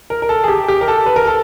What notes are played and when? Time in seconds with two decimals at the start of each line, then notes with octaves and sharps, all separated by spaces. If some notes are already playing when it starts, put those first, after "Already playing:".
0.10 A#4
0.22 A#4
0.29 A4
0.44 G#4
0.48 G4
0.68 G4
0.81 A#4
0.88 A4
1.06 B4
1.16 A#4
1.27 A4